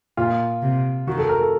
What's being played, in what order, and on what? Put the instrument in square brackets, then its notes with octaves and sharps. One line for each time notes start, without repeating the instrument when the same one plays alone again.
[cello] A#2 [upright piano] F4
[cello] C3
[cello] D#3 [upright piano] F#4
[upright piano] A4
A#4
A4